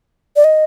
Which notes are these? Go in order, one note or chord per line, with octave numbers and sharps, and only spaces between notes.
D5
D#5